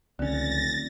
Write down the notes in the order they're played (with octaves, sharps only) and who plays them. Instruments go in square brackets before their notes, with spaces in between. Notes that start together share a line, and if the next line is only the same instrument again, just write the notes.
[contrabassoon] F1 [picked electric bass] C#2 C#4 [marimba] D3 [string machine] A6 A#6